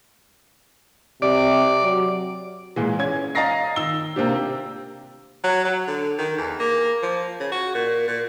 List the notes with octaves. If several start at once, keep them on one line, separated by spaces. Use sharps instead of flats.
C3 D5
F#3
A#2 E3 G#3
C#4 G#6
D#5 F5 A#5 A6 A#6 C7
D#3 E6 G7
C3 A#3 C4 D4 G4
F#3
F#3
D3
D#3
E2
A#3
F3
C#3
F#4
A#2
A#2